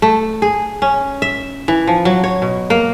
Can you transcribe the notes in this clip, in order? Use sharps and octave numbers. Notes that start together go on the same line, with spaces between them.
A3
G#4
C#4
E5
E3
F3
F#3
C#5
B2
A#3